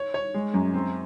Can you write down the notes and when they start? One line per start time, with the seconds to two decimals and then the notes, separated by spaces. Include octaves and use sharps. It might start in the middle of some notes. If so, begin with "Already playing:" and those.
Already playing: C#5
0.14 C#5
0.34 G#3
0.54 F#2
0.74 C4